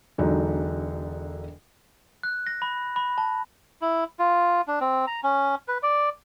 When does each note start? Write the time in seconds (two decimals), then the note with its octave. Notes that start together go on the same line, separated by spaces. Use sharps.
0.18 E1 D3 F#3 D#4
2.23 F#6
2.47 A#6
2.62 B5
2.96 B5
3.18 A5
3.81 E4
4.19 F4
4.67 D4
4.81 C4
5.07 A#5
5.23 C#4
5.68 B4
5.83 D5